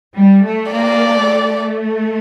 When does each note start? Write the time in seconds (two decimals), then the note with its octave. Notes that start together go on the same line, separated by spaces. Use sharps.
0.16 G3
0.43 A3
0.71 A#3 D5
1.15 A3